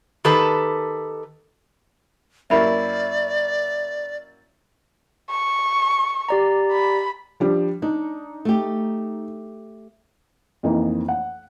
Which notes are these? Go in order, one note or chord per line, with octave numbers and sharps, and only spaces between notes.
D#3 G4 A4 B4 A5
F#2 A#3 E4 D5 E5 B5
C#6
G4 D5 A#5
B5
F3 G3 D4
D4 D#4
A3 G4
F2 E3 A#3 D#4
F#5